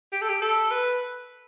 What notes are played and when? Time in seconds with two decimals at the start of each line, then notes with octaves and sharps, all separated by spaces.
0.12 G4
0.22 A4
0.29 G4
0.42 A4
0.71 B4